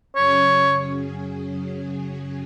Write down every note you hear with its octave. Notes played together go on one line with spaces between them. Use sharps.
F#2 C#3 F#3 C#4 G#4 C#5